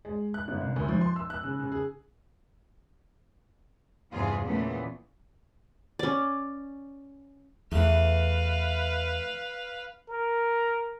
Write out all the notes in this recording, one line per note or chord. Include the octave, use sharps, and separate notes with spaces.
G#3
F#6
G1
C2
D2
F3
C6
E6
F#6
C#3
C#3
G#4
E2 G2 C3 E3 F4 G#4
A#2 C#3 E3 A3 B3
C#4 D5
E2 E3 A3 B4 F5
A#4